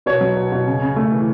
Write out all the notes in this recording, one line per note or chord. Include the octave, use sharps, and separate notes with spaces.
B2 C#5
F#3
B2
B2
C#3
C#3
A3
E3